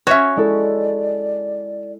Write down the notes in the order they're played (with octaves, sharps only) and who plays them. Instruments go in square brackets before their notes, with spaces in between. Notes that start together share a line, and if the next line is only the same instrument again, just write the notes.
[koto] C#4 F#4 [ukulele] C#5 E5
[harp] G#3 E4 A4 [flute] D5